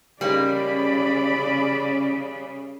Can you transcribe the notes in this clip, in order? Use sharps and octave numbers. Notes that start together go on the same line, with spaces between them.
C#3 G3 A#3 D#4 D5 B5